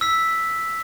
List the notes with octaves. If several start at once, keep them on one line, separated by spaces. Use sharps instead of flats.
E6 B6